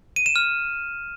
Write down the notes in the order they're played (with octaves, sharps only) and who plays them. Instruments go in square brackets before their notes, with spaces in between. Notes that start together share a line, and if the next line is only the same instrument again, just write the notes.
[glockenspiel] D#7
E7
F6